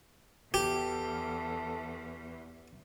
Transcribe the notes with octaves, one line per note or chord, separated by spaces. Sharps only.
E2 E3 G4 A4